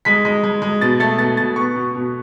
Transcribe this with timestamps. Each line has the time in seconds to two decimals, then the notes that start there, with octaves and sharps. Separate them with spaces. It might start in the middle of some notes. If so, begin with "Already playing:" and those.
0.05 G#3 B6
0.25 G#3
0.43 G#3
0.62 G#3
0.81 B2 A6
1.00 A3 A6
1.19 B2 A6
1.37 B2 A6
1.56 B3 C#6
1.75 B2
1.95 B2